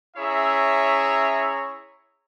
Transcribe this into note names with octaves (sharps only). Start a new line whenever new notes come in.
C#4 E4 G#4 C#5 E5 A#5